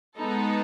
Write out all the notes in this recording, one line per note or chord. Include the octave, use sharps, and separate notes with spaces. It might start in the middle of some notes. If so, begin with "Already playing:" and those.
G#3 B3 D#4 A4